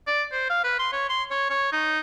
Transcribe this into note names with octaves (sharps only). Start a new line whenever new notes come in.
D5
C5
F5
B4
C6
C#5
C6
C#5
C#5
D#4